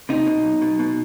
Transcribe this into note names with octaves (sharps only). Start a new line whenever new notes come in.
C3 D#4
B2
B1
B2
B2